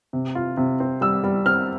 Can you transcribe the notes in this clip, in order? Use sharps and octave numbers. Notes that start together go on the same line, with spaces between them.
C3
F4
C3
C4
G3 E6
G3
C4 F6